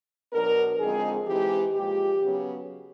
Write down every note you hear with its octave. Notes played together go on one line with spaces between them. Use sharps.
B2 F#3 B3 D4 A#4
D3 F3 G#3 C4 D#4 G#4
E3 G#3 C4 D#4 G4
A#2 F3 G#3 G4
C#3 F#3 B3